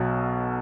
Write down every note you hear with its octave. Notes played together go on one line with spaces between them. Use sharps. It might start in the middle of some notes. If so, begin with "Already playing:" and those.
Already playing: B1 B2 F#3